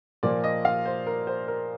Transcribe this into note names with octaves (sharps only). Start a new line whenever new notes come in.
A#2 F3 A#3 D5
D#5
F5
C5
A#4
C5
A#4